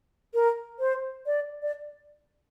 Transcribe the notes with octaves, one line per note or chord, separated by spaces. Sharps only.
A#4
C5
D5
D5